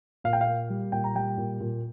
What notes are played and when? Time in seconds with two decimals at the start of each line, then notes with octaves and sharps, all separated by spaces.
0.24 A#2 F5
0.33 G5
0.41 F5
0.47 A#3
0.70 G3
0.92 A#2 G5
1.04 A#5
1.15 G3 G5
1.38 A#2
1.61 A#2